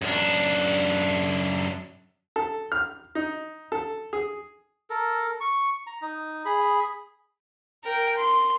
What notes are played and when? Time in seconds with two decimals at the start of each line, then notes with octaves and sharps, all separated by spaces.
0.02 F#2 D4
2.36 A4
2.72 F6
3.15 D#4
3.72 A4
4.13 G#4
4.90 A4 A#4
5.40 C#6
5.87 A#5
6.02 D#4
6.45 G#4 B5
7.84 A#4 G5
8.17 C6